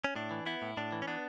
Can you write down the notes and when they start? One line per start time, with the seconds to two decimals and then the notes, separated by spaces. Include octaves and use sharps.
0.04 C#4
0.16 A2 D4
0.31 E3
0.46 B3 E4
0.62 A2
0.77 A2 D4
0.92 E3
1.02 C#4
1.07 B3 D4